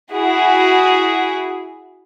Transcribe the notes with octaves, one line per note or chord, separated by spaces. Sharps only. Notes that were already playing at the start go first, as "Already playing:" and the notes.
E4 F#4 G#4